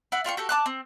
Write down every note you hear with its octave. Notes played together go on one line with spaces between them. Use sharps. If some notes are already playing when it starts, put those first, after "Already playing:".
E4 F#5
D4 F4 G5 C#6
F#4 G4 A4
A5 D6 F#6
C4